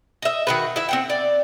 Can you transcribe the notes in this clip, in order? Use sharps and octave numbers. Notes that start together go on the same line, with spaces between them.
D#5 E5
D#3 F#4 B4
E4 E5
C4 F#5 G5
D5